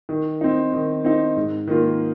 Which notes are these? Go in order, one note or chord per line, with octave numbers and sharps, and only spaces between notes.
D#3
C4 D#4
D#3
C4 D#4
G#2
D#3 A#3 F4